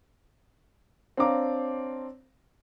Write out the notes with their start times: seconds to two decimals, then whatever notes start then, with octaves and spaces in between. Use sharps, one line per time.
1.17 C4 D4 C#5 F5 A#5 D6